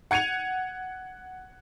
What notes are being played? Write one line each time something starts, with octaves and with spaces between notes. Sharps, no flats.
F#5 G#6 C#7 D#7 F7